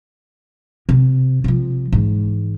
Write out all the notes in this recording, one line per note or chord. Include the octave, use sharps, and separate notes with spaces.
C3
C3 F3
G#2 E3